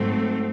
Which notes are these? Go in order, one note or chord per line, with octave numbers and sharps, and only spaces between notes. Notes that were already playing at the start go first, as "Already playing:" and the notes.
Already playing: G#2 F#3 A3 C4